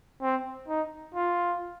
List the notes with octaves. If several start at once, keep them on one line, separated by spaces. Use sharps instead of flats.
C4
D#4
F4